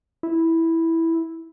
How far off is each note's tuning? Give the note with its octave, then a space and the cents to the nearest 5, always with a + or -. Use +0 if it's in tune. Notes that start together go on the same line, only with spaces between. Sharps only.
E4 -5